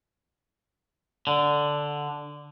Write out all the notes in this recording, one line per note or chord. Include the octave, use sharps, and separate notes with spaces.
D3